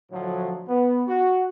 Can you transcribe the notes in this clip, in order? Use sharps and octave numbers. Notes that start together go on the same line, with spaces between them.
A2 D3 F3 F#3
B3
F#4